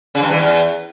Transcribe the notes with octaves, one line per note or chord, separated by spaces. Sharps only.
C#3
G2
E3
E2